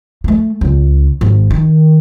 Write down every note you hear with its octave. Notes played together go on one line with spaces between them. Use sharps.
A3 A#3
C#2
G#1
D#3